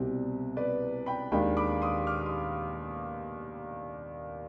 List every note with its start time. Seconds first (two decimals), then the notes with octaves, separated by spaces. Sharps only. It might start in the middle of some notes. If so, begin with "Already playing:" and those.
Already playing: C2 B2 G3 C4
0.57 B4 D5
1.06 G5 B5
1.32 D#2 D#3 G#3 D4 G5 B5
1.57 B5 D6
1.82 C6 D#6
2.07 D6 F6
2.26 C6 D#6